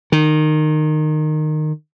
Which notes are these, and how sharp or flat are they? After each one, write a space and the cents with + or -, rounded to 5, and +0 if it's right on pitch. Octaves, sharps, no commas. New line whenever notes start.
D#3 -20